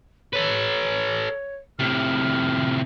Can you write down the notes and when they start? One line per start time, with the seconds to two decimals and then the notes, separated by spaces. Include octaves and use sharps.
0.33 A4 B4 C#5
1.79 A2 C3 F6